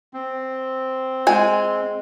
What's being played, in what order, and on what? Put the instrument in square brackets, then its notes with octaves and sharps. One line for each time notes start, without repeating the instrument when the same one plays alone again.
[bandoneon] C4
[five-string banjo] G#3 G#5